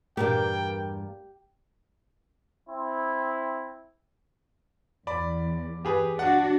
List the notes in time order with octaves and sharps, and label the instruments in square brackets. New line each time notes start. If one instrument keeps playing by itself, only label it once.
[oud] E2 G2 A#2 [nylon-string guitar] A#3 D4 [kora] G4 [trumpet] G5
[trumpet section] C4 E4
[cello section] E2 [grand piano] D5 B5
[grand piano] G4 G#4 B4
[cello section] D4 F#4 [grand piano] F#5